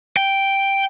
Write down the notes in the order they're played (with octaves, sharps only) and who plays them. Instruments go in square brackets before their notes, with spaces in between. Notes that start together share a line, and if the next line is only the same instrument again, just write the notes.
[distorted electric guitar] G5